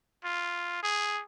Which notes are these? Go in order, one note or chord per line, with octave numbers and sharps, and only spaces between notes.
F4
G#4